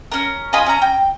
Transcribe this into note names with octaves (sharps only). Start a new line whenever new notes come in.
C#4 A#4
F4 D#5 G#5 B5
C#4 A#5
G5